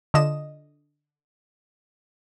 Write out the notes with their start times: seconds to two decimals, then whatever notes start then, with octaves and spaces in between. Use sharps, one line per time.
0.14 D3 F4 D#5 E7